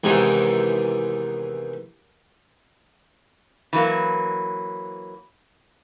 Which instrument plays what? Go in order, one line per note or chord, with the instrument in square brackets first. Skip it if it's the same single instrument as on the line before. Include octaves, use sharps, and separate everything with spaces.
[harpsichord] E2 G#2 C3 D#3 E3
[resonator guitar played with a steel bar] E3 F#3 A#3